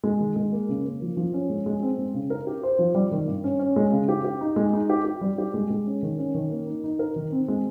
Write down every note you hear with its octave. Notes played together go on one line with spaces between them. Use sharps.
G#3
D#3
G#3
A#3
C#3
A#3
F3
F3
C#4
G#3
G#3
C4
G#3
C#3
A#4
G4
C5
F3
G3
D#3
G2
C#4
C#4
G#3
C#3
G4
G4
D#4
G#3
D#4
G4
G4
G3
G4
G#3
G#3
C#4
D#3
C#4
D#3
A#3
D#4
D#4
A#4
D#3
C4
G#3